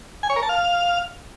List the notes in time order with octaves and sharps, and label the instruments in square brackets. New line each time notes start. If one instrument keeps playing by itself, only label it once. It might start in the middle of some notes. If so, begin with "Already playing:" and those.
[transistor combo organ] G#5
C#5
A#4
A5
F5